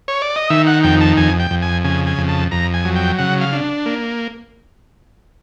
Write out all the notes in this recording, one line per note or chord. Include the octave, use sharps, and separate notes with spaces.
C#5
D5
D#5
D#3 E5
F#5
F2 G5
A5
F2 G#5
G5
F2
G#5
C#3 G#5
G#5
F2
A5
F2 A#5
G#5
F#3
G5
C#3 F#5
F5
D4
A#3